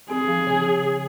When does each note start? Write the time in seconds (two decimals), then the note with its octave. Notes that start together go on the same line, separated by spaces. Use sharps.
0.10 C4 G#4
0.28 F3
0.47 C#3
0.64 C#3
0.83 C#3